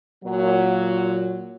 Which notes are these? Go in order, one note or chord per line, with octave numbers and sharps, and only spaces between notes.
A#2 F#3